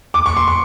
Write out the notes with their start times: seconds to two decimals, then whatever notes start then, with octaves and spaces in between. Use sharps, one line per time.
0.14 D6
0.26 C#6
0.37 C6
0.48 C#6